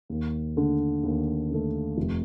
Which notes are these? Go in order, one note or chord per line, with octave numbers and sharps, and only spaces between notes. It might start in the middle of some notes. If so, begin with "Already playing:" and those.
D#2
D3 A3
D#2
D3 A3
F1